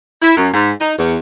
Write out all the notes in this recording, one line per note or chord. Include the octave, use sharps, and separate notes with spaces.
E4
F#2
G#2
D#4
E2